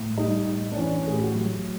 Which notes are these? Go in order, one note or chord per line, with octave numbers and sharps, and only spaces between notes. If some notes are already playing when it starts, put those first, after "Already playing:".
Already playing: A2
G3 D#4
A2
D4
E3 C#4
A2 G#4
G4
F#4
G4
F#3